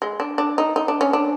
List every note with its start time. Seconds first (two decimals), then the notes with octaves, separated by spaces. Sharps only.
0.02 G#3
0.20 D4
0.38 D4
0.58 D#4
0.76 D#4
0.88 D4
1.01 C#4
1.13 D4